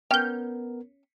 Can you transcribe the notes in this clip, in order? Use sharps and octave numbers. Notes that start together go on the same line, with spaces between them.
B3 C#4 A#4 G5 F6 G6